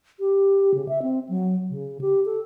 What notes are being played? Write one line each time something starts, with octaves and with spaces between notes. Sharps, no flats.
G4
C#3
E5
C4
F#3
C#3
G4
A4